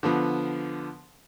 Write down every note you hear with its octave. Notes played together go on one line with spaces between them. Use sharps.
D3 F3 B3